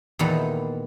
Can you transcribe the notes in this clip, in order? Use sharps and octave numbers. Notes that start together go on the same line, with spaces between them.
E2 A#2 D#3 A4 B4 A#5